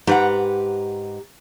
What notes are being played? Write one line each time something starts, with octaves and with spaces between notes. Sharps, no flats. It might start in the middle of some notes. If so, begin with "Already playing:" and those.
G#2 G4 B4 F#5 A#5